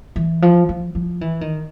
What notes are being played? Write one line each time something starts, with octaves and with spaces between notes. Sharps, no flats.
E3
F3
F3
F3
E3
D#3